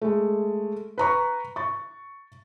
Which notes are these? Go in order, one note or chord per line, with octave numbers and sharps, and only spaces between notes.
G#3 A3
B4 A#5 C#6
C#6 A6